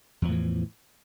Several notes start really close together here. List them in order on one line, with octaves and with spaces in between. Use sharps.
E2 F3 A2 E3